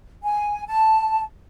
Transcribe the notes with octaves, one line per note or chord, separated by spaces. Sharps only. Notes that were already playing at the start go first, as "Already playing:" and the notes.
G#5
A5